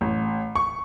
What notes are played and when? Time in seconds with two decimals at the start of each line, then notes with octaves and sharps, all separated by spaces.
0.01 A1
0.56 C#6